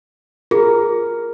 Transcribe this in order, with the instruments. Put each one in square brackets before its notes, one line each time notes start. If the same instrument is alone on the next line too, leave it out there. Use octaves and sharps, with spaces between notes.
[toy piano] F4 G#4 [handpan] A#4